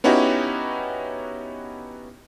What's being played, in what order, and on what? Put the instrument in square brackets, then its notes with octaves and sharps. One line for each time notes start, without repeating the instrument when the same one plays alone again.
[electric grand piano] B3 C#4 D#4 E4 F#4 G4